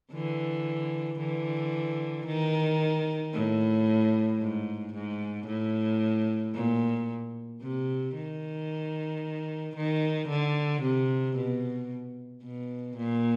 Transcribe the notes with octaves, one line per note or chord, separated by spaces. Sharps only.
D3 E3
D3 E3
D#3
A2
G#2
G#2
A2
A#2
C3
D#3
D#3
D3
C3
B2
B2
A#2